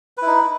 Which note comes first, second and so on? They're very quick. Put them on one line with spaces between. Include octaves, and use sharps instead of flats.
B4 E4 D#4